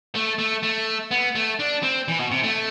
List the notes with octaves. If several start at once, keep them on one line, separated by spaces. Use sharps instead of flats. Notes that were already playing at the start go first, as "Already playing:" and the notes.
A3
A3
A3
B3
A3
D4
C4
E3
B2
C3
A3